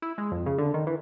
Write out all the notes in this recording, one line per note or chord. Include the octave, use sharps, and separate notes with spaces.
E4
G#3
F2
C#3
D3
D#3
E3